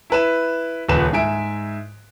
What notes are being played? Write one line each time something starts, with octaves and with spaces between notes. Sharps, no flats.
E4 B4 E7
D#1 C#2 B4 E7
G#2 E5 G#5 D7